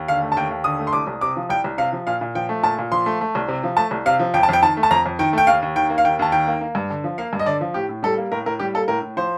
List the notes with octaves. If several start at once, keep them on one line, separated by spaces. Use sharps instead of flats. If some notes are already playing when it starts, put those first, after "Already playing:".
Already playing: D#2
D3 F5
A3
A5
D#2 G5
D#2
D3 D#6
A3
C6
C2 D6
C2
C3 D6
F3
C2 G5
C2
C3 F5
F3
A#2 F5
A#2
F3 G5
A3
A#2 A5
A#2
F3 C6
A3
A3
C2
C3
F3
A3 A5
C2
C3 F5
F3
F2 G5
A5
F2 G5
D#3 A5
A3
A5
F2 A#5
F2
D#3 G5
A3 G5
D#2 F5
D#2
D#3 G5
A#3
F5
D#2 G5
D#2 A5
D#3 G5
A#3
A#3
G2
D3
F3
A#3 F5
G2
D#5
D3 D5
F3
A2 G4
A2
G3 A4
A#3
A2 A#4
A2 A#4
G3 G4
A#3 A4
A2 A#4
A2
F3 C5